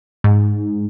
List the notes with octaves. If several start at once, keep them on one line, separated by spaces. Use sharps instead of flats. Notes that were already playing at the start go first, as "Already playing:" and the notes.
G#2